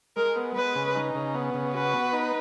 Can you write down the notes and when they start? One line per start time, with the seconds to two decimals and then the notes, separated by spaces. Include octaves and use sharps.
0.16 G#3 A#4
0.36 B3
0.56 G#3 B4
0.75 C#3
0.95 D#4
1.15 C#3
1.34 B3
1.54 C#3
1.74 F#4 B4
1.94 B3
2.13 D#4